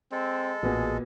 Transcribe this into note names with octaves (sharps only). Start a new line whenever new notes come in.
G#3 C4 A4
A1 A#2 B3 F#4 G#4